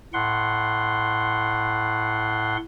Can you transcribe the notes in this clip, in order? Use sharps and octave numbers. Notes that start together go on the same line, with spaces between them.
A2 F#5 C6